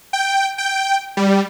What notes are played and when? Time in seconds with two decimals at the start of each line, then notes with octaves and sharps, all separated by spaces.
0.13 G5
0.58 G5
1.17 G3